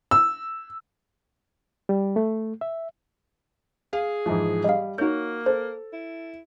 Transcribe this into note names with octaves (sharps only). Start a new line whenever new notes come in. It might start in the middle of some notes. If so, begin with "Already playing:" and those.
E6
G3
A3
E5
G#4 F5
G#2 E3 F3
G3 D#5 F5
A#3 D#4 F#4 C#5 G6
A4 C5
E4